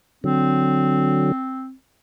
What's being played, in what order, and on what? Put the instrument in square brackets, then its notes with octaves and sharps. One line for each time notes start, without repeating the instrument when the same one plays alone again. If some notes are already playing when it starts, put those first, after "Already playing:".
[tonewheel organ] D3 F#3 [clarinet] C4